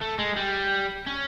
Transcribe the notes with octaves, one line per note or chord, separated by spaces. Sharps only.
A3
G#3
G3
C#4